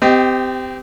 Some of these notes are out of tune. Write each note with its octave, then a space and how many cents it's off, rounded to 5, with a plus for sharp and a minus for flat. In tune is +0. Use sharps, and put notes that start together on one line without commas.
C4 -30 G4 +0 D#5 +0